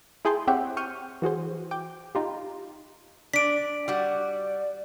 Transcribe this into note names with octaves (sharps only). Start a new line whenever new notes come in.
E4 G#4 G5 A5 C6
C4 G4 C#5 E5 F#5 G5
C#6 F6 G6 D#7
E3 F#4 G#4 C5
G5 D6
D#4 F4 G4
D4 D5 B6 D7
G3 F#4